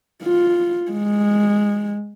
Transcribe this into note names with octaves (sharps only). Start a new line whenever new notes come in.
F4
G#3